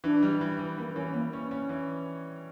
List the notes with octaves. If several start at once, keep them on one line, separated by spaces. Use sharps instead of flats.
E3 D4
G3
E3
E3
E3 A#3
E3 C#4
E3 A#3
C#4
C#4
E3